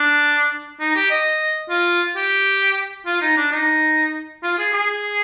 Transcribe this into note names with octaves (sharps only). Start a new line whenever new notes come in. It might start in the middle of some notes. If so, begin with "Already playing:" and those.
Already playing: D4
D#4
G4
D#5
F4
G4
F4
D#4
D4
D#4
F4
G#4
G#4